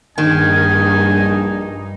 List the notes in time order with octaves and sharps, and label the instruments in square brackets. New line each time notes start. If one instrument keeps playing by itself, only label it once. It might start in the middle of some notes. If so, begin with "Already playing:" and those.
[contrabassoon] A#1 [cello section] G2 D#4 [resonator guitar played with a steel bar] D#3 [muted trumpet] G#5